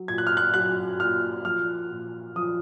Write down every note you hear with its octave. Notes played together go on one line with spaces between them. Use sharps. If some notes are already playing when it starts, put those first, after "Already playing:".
Already playing: F#3
A#2 G#6
F#6
F6
F#6
F#3 F#6
A#2 F6
F3 F6
A#2
F3 D#6